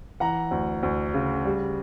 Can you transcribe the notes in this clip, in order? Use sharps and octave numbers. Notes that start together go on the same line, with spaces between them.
E3 F#5 A#5
D2
D2
C#3
G3